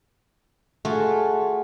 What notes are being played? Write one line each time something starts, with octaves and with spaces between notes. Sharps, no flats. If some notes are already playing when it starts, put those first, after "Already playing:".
A3 F4 F#4 G#4